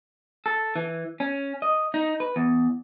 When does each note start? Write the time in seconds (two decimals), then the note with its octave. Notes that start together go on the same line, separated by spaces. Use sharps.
0.46 A4
0.76 E3
1.20 C#4
1.62 D#5
1.94 D#4
2.20 B4
2.36 E2